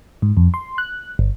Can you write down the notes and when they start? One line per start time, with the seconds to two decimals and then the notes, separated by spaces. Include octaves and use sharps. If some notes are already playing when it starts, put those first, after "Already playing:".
0.22 G#2
0.37 F2
0.54 C6
0.78 F#6
1.19 G1